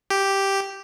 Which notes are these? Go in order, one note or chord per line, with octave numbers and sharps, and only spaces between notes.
G4